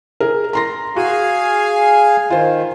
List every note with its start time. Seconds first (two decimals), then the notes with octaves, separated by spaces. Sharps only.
0.20 G#4 A#4
0.53 A#5 C6 A#6
0.96 F#4 G#4 F5 G#5
2.30 D#3 F4 C5